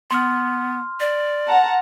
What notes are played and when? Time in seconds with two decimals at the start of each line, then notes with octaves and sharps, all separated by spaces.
0.11 B3 C6 F6
1.00 D5
1.47 F#5 A5 A#5